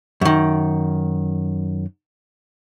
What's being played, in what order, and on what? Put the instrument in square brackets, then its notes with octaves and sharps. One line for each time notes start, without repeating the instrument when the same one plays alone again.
[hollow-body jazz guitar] F#2 D#3